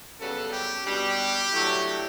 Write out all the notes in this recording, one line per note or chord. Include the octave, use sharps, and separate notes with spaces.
F#2 C#3 G3 B3 A4
G4
B2 G3 D4 G4
A2 F#3 A3 D4